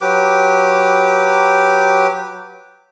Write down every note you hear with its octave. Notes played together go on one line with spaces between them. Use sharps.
F#3 G4 B4 D6